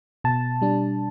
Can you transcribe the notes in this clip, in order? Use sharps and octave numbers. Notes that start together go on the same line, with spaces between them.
B2 A5
G3 D4